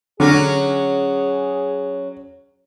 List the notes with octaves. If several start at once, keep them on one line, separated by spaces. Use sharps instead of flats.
D3 F#3 C#4 F#4 G#4